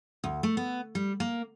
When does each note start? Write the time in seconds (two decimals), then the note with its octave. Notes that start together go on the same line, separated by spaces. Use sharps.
0.24 D2
0.43 A3
0.57 B3
0.95 G3
1.20 A#3